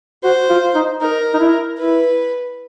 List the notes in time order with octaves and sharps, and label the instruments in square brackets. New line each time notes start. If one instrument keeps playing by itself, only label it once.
[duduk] F#4 [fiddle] C5
[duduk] F4
D#4
[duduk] D#4 [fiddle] A#4
[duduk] D#4
E4
[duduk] E4 [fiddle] B4